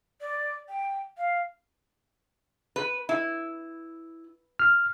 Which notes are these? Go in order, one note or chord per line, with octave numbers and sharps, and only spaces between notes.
D5
G5
F5
B4
E4
F6